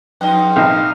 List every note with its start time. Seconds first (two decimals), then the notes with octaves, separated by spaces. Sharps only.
0.21 F2 G#2 B4 D#5 G5 F#6
0.56 A#1 C3 D#4 F5